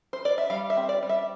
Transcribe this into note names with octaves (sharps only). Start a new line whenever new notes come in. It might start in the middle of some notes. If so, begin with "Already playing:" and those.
C5
D5
E5
G3 F5
E5
C4
D5
G3
E5